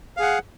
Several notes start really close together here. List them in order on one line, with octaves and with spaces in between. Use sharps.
F5 G#4 F#5